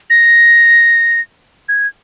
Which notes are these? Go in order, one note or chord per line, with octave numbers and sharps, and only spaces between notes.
A#6
G#6